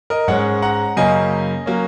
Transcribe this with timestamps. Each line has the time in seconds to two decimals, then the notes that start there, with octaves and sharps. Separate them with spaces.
0.10 A#4 D#5
0.28 G#2 G#3 C#4 C#5 F#5
0.62 F#5 A#5
0.97 F#2 C#3 A#3 C#4 D#5 G#5
1.66 F#3 A#3 C#4